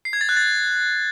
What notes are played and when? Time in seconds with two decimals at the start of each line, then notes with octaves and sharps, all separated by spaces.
0.05 C7
0.13 G#6
0.21 A6
0.29 F#6
0.37 A6